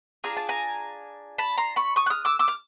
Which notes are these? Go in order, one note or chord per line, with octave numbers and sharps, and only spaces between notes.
D4 F4 G#4 A#5
A5
G#5 A#5
A5 B5
A#5 C6
B5 C#6
C#6 D#6
F#6
D#6 F6
D6 E6
D6 E6
F6